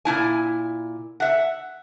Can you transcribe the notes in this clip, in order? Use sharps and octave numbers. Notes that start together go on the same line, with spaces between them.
A#2 D#4 E4 G#5
E5 F#5